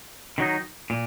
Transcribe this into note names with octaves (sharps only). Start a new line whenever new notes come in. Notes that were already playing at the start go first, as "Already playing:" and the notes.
D#3 F#3 D#4
A#2